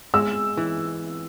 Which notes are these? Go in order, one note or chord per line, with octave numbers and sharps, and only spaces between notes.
G#3 E6
E3